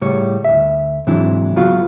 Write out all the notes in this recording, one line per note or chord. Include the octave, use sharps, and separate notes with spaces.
A2 C#3 G3 C#5
D2 E5
G#2 C3 E3 F#3 D4 E4
C#2 F#3 B3 F4 F#4 F5